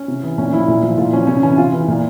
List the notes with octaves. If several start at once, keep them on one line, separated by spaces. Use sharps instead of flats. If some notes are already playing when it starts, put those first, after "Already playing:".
Already playing: C#4
C3
E3
A#2 C#4
F3 E4
A#2
F3
A#2 F4
F3 C#4
C3 C#4
E3 C#4
C3 F4
E3
A#2